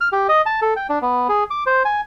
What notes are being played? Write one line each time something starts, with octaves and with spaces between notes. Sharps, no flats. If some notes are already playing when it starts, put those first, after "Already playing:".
F6
G4
D#5
A5
A4
G5
D4
B3
G#4
D6
C5
G#5